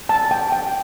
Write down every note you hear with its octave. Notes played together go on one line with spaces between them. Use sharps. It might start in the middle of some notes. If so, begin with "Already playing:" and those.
A5
G5
G5